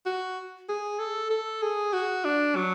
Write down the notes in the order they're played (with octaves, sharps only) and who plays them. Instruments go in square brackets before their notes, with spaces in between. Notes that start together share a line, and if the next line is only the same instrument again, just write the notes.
[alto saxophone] F#4
G#4
A4
A4
G#4
F#4
D4
F#3